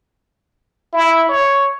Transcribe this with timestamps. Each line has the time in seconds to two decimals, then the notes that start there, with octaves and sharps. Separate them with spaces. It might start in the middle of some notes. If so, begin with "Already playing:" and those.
0.93 E4
1.29 C#5